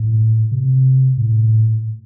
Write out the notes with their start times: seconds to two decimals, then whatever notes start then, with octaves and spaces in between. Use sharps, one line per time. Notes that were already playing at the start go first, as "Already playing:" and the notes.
Already playing: A2
0.52 C3
1.17 A2